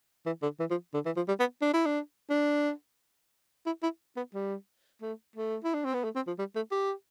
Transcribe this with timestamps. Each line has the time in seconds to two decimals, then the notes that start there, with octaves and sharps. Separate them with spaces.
0.26 E3
0.42 D3
0.60 E3
0.71 F3
0.94 D3
1.06 E3
1.17 F3
1.28 G3
1.40 B3
1.62 D4
1.74 E4
1.86 D4
2.30 D4
3.66 E4
3.83 E4
4.17 B3
4.34 G3
5.02 A3
5.36 A3
5.64 E4
5.74 D4
5.85 C4
5.94 B3
6.04 A3
6.16 C4
6.27 F3
6.39 G3
6.56 A3
6.71 G4